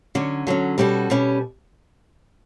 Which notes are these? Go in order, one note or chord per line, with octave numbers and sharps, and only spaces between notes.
D3 F#3 C#4
D3 F#3 C#4
B2 G3 C#4 F#4 A4
B2 G3 C#4